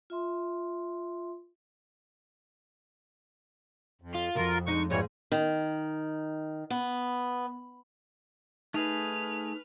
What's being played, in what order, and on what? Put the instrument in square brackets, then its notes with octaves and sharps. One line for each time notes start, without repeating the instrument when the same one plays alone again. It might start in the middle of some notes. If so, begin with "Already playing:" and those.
[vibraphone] F4 E5 C6
[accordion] F2
[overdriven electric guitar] F4
[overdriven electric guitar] B1 F2 [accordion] F4 A#4 [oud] F#4
[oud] G#3 D4 D#4 [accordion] C#6
[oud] D#2 G#2 G#4 [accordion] E3 G3 C#5
[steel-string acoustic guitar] D#3
B3
[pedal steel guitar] A3 G#4 [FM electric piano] D#4 [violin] B4 F6